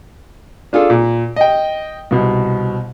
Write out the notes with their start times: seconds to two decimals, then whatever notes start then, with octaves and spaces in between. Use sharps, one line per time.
0.73 D4 F4 G#4 A4
0.90 A#2
1.36 D#5 G5
2.11 C2 B2